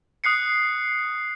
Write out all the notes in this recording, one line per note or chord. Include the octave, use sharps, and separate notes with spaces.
D#6 F#6 C7 C#7